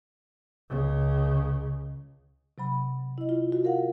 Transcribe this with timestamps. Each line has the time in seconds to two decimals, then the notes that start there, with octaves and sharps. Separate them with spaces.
0.69 C#2 C#3
2.58 C3 F#3 B5
3.18 E4 D#5
3.29 F4
3.52 F#4
3.65 A#4 F5 F#5